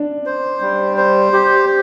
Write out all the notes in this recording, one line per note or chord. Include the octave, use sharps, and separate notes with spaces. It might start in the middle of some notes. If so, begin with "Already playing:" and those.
Already playing: D4
C5
G3
C5
G4